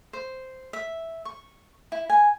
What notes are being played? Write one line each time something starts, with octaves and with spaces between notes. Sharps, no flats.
C5
E5
C#6
E4
G#5